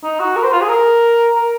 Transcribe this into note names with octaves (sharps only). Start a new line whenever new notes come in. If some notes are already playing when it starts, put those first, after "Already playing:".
D#4
F#4
A#4
C5
F4
G#4
A#4
A#4